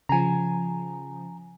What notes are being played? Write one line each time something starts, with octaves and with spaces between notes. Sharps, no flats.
C#3 F3 G#5 A#5